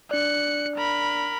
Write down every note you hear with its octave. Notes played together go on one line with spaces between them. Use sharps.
D4 D5 F#6 C#7
A#4 B5